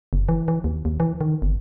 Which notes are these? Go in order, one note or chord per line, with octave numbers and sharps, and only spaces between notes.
F#1
E3
E3
D#2
D#2
E3
D#3
G1